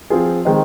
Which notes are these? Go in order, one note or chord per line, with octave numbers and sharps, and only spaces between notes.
F3 C4 F4 G#4
D#3 G#3 C4 D#4